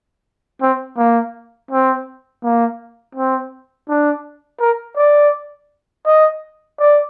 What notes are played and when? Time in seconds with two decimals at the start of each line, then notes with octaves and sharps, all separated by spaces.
0.62 C4
0.98 A#3
1.71 C4
2.44 A#3
3.15 C4
3.89 D4
4.60 A#4
4.97 D5
6.06 D#5
6.79 D5